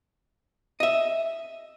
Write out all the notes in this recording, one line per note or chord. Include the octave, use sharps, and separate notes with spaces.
D#5 E5